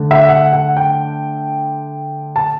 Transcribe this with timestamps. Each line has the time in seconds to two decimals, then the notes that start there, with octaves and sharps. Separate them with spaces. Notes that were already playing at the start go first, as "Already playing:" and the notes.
Already playing: D3 A3
0.11 E5
0.29 F#5
0.53 F#5
0.77 G5
2.36 A5